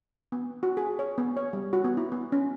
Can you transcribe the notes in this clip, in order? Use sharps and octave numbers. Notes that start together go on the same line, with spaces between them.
B3
F#4
G#4
C#5
B3
C#5
G3
F#4
B3
E4
B3
C#4